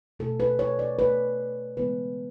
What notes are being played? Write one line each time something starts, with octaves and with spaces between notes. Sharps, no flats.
B2 A3 A4
B4
C#5
D5
D3 A3 B4
C#3 E3 G#3 B3 B4